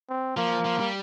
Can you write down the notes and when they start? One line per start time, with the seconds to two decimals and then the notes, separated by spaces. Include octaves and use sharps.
0.09 C4
0.37 F3 A#3
0.65 F3
0.80 G3